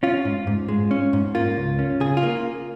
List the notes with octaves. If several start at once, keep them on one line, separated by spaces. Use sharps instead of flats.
C#4 F4
G#2
G#2
G#3
C#4
G#2
A#3 F4
C#2
C#4
C#3 G#4
F4
A#3